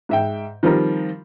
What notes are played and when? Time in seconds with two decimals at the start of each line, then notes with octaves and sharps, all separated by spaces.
0.09 G#2 E5 G5
0.63 D#3 F3 G3 C4 F4 A#4